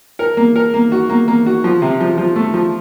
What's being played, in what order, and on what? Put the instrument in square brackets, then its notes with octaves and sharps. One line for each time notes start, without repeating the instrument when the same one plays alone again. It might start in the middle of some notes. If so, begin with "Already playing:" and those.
[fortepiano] A#4
A#3
A#4
A#3
F#4
A#3
A#3
F#4
F3
C3
F3
F3
A3
F3